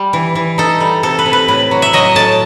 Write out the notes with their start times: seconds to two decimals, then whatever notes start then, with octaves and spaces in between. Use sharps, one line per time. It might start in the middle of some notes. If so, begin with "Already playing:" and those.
Already playing: G3
0.13 E3
0.35 E3
0.58 D#4 A4
0.81 G3
1.03 C3 A4
1.19 B4
1.26 C3
1.33 B4
1.48 A2 B4
1.71 F#3
1.82 E5
1.93 F#3 D#5
2.16 A2 A5